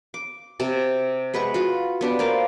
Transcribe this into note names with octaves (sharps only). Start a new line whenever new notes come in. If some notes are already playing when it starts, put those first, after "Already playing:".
D6
C3 A5
G#3 B4 F#5 C#6
F4 F#4
B3 D4 G4
A#3 C5 D5 F5